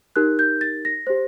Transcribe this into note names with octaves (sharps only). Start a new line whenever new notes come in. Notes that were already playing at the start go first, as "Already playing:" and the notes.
D#4 G4 A#4 F#6
G6
A6
A#6
G4 C5